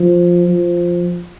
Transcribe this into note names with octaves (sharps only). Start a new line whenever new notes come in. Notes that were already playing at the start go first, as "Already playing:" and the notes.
Already playing: F3
F3